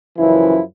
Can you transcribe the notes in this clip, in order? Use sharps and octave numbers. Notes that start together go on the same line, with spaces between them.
F#2 C#3 E3 F3 E4